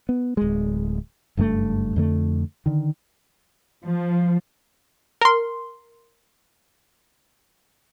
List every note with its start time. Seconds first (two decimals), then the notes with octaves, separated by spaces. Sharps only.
0.09 B3
0.37 D1 G#3
1.37 F#1 G2 C#3 A3
1.96 F2 D3 A3
2.66 D3 D#3
3.86 F3
5.21 A#4 C6